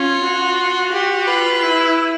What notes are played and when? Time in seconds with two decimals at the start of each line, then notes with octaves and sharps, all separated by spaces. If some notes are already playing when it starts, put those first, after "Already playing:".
Already playing: C#4 F4
0.23 F#4
0.92 G4
1.27 F4 B4
1.62 E4